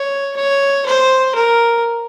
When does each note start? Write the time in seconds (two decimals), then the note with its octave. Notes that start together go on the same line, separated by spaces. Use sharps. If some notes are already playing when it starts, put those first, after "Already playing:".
Already playing: C#5
0.37 C#5
0.86 C5
1.35 A#4